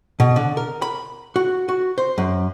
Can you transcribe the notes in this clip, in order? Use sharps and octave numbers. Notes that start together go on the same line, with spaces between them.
B2
D3
A#4
B5
F#4
F#4
C5
F#2